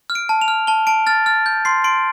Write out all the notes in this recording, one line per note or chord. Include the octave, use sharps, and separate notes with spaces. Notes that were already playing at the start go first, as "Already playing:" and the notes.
F6
D7
A5
F7
F6
A5 G7
A5 D7
F6 A6
F6 A6
G6
C6 C7
C6 D7